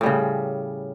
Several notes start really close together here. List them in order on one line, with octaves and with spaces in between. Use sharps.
A2 G3 C#3